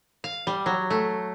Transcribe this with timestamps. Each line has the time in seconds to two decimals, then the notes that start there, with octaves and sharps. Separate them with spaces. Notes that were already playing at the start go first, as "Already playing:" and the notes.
0.24 F5
0.47 G3
0.66 F#3
0.90 A3